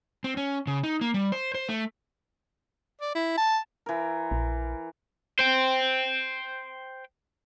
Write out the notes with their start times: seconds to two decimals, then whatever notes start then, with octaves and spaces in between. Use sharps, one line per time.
0.24 C4
0.37 C#4
0.67 C#3
0.84 D#4
1.01 A#3
1.14 G3
1.32 C5
1.55 C5
1.69 A3
3.01 D5
3.15 E4
3.37 A5
3.86 E3 A#4
4.31 A#1
5.39 C5 G5